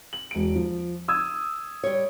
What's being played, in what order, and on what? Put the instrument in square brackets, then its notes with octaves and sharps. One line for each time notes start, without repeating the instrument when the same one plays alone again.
[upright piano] F#7
E1 D7
F3
D#6 E6 G#6
[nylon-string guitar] G3 C#5